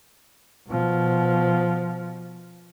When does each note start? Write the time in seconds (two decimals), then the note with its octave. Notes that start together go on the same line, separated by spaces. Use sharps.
0.68 B2 F3